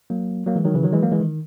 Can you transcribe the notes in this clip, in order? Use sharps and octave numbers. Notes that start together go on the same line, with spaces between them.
F#3 A#3
F#3 A#3
E3 G#3
D#3 F#3
C#3 E3
D#3 F#3
E3 G#3
F#3 A#3
E3 G#3
D#3